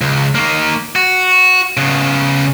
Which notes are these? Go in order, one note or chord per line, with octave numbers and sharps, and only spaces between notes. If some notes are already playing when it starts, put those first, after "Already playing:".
C#2
D#3 A#3
F#4
C#3 B3